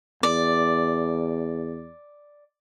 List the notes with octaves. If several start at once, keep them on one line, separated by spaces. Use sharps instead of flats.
E2 D5